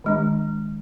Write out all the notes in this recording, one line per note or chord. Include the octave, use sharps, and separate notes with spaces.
D#3 G#3 D4